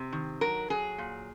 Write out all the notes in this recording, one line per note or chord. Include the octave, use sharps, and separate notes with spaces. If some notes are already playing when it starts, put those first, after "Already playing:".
Already playing: C3
D#3
F#3 A#4
F#3 G#4
A#2